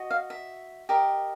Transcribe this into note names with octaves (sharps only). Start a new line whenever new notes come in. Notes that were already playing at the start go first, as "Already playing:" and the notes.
Already playing: F#4 D#5
F5
E5
G4 A#4 D#5